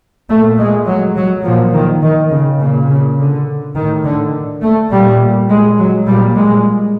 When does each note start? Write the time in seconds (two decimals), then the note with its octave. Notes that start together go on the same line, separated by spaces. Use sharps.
0.29 A#2 A3
0.59 G#3
0.87 F#3
1.16 F#3
1.44 A#2 F3
1.74 D#3
2.03 D#3
2.31 C#3
2.60 A#2 C#3
2.89 C#3
3.19 D3
3.76 A2 D#3
4.05 D3
4.62 A3
4.91 A#2 G3
5.50 G#3
5.78 F#3
6.07 A#2 G3
6.35 G#3